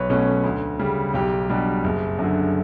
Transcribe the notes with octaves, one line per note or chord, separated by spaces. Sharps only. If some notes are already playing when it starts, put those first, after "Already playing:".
Already playing: B1 B4 C#5
B2 A3 C#4
D2
C#3 G3
B1 G4
B2 G3 D4
F#1
F#2 D3